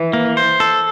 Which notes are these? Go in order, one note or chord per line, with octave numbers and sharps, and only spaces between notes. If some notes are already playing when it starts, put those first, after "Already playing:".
Already playing: E3
A#3
C5
A4